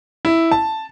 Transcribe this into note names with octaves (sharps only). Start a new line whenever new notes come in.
E4
A5